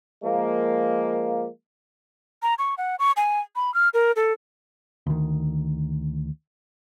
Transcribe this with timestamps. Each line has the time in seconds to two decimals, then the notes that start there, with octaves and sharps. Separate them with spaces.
0.24 F3 G#3 A#3
2.42 A#5
2.59 C#6
2.78 F#5
2.99 C#6
3.17 G#5
3.56 B5
3.74 F6
3.94 A#4
4.16 A4
5.07 D2 D#3